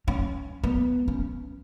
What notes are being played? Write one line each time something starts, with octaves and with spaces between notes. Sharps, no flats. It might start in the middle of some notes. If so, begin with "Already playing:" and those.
C#4
B3
C#4